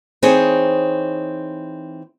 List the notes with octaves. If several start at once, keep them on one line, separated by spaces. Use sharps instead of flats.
E3 C4 D#4 G#4 C5 C#5